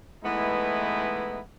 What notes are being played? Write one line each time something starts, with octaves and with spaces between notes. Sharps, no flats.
E3 G#3 A3 B3 D#4 E4